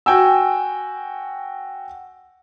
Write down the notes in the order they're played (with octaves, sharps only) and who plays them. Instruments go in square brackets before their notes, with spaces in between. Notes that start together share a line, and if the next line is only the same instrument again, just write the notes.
[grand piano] F#4 G5 G#5 E6